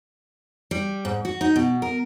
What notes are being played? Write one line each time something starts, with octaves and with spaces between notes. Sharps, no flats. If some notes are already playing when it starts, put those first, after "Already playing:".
G3
G#2
F#4
D#4
B2
A#4